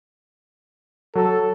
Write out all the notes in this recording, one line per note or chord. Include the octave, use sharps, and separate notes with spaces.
F#3 A4